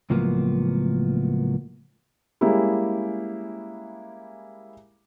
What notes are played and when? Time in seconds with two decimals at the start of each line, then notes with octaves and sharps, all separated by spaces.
0.10 C#2 A2 F3 F#3 A#3 B3
2.41 G3 G#3 A#3 C#4 E4 G4